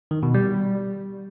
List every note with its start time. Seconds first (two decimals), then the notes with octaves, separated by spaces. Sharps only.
0.11 D#3
0.23 B2
0.34 G3